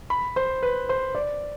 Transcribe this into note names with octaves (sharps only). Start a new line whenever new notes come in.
B5
C5
B4
C5
D5